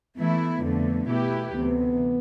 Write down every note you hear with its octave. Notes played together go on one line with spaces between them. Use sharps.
E3 A3 B3 E4
F2 D3 A3
B2 A3 E4 G4 B4
D2 C3 E3 B3